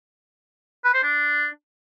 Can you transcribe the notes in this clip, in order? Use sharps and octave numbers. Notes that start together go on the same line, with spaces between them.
B4
C5
D4